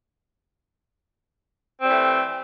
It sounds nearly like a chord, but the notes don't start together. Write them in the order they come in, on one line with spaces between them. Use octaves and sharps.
C4 G3 E3 A3